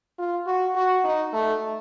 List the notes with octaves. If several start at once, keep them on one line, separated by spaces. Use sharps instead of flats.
F4
F#4
F#4
D#4
A3